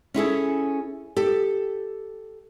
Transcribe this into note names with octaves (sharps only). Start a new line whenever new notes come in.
C#4 E4 G#4 A4
G4 A4